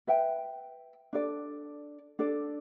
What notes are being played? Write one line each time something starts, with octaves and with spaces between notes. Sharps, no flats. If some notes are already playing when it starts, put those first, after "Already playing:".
B4 E5 G5
D4 A4 D5
D4 A4 D5